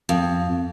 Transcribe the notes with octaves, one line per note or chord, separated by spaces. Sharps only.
F2